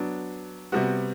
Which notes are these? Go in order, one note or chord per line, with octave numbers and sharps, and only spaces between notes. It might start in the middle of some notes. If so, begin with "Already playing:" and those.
Already playing: F#3 B3 D4
C3 G3 B3 F#4